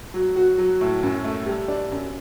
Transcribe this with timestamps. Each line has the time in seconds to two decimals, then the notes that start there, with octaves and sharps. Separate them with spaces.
0.14 F#3
0.36 F#4
0.58 F#3
0.81 A2
1.03 F#2
1.24 A3
1.46 G3
1.68 D4
1.92 F#2